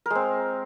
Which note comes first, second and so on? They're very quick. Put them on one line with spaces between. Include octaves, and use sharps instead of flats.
A#4 G#3 C4